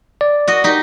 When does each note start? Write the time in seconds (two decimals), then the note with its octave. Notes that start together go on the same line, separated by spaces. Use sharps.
0.21 D5
0.48 F#4 D#5
0.64 D#4 G4